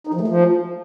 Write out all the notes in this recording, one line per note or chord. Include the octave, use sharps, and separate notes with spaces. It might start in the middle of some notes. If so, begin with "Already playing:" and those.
D#4
F3
A3
F3